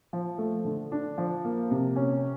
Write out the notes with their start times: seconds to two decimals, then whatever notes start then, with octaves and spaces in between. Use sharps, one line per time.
0.13 F3
0.38 A3
0.65 D3
0.92 D4
1.18 F3
1.45 A#3
1.71 C3
1.96 C#4